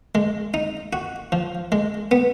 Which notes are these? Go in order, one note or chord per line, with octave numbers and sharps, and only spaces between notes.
G#3
D#4
F#4
F3
G#3
B3